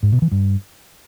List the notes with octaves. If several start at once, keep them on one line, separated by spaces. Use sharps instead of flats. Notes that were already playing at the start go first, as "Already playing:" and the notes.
G#2
B2
E3
G2